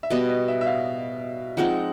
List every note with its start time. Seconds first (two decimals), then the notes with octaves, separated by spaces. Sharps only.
0.03 E5
0.10 B2 G3 B3 D#5
0.29 D#5
0.48 E5
0.61 E5
0.66 F5
1.57 F3 G#3 C4 D#4 F#5